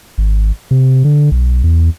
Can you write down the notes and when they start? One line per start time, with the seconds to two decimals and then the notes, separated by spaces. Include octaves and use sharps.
0.18 G#1
0.71 C3
1.04 D3
1.31 B1
1.64 E2